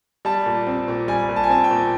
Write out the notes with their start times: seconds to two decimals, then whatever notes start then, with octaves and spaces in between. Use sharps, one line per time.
0.25 G3 A5
0.46 A#2
0.67 C4
0.88 A#2
1.08 G3 G#5
1.29 A#2
1.36 A5
1.44 G#5
1.49 C4 A5
1.64 G5
1.71 A#2